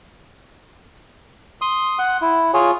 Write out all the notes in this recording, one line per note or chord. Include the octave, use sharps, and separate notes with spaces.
C6 D#6
F#5
E4
F4 G#4 C#5